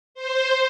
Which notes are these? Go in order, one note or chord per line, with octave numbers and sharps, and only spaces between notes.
C5